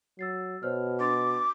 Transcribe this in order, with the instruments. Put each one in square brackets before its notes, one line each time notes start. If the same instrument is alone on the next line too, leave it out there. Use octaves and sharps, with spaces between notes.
[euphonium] F#3 [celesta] E6 A6 C7
[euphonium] B2 [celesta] C5 C#5 F6
[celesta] D4 C6 A6 [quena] D6